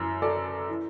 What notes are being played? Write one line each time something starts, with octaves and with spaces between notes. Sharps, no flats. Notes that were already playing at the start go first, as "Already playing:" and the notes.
Already playing: F#2 E3
A4 D5
E3